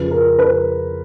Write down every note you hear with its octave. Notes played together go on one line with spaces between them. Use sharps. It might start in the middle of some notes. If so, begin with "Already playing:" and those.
Already playing: F2 C#3 F3 B4
A#4
B4